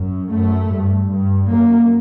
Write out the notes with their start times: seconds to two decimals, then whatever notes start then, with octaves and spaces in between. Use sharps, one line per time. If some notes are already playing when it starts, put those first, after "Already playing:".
Already playing: F#2
0.31 F#2 A3
0.71 G2
1.09 G2
1.48 F#2 A#3